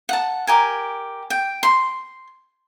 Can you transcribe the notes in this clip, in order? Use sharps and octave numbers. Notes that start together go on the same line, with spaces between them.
F#5 A5
G4 A#4 G#5
G5
C6